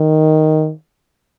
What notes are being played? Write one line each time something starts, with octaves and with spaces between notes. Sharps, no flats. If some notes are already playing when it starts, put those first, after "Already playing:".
Already playing: D#3